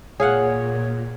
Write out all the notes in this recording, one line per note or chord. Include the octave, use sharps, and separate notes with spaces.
A#2 G#4 C#5 F5 F#5